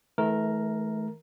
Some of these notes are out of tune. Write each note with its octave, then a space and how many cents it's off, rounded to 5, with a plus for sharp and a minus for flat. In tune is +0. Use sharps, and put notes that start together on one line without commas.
E3 -35 A3 -25 A#4 +0